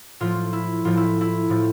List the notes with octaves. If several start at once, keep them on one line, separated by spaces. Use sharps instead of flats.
A2 F3 A3 F4
E4
A2 F3 A3 F4
E4
E4
A2 F3 A3